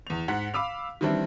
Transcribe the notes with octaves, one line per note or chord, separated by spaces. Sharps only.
E2 F7
G#2 F#5 B6
F5 B5 D6 E6 F7
D#3 E3 G3 C4 D4 E4